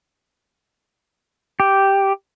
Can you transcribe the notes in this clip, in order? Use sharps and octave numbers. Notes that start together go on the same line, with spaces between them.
G4